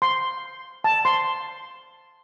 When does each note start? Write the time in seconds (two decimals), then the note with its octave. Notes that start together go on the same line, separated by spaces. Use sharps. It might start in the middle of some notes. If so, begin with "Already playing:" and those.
0.02 C6
0.84 A5
1.05 C6